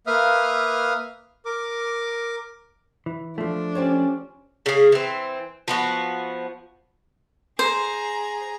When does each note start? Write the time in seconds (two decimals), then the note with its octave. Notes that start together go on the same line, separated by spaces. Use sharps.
0.07 A#3 B4 E5 F5 D#6 F6
1.45 A#4 D6
3.06 E3
3.38 F3 A3 D4
3.75 C#4 G4 C5 C#5
4.66 C#3 G#4
4.92 E3 C4
5.68 F3 B3 F#4
7.59 G#4 C5 A#5